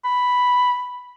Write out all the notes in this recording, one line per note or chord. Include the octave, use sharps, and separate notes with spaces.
B5